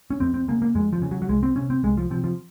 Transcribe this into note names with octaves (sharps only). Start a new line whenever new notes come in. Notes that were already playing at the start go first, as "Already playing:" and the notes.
C#4
F2 C4
C4
C#3 A#3
A#3
F2 G#3
F3
C#3
F#3
F#3
C2 G#3
C4
C3 C#4
C4
C2 G#3
F3
C3 F3
F3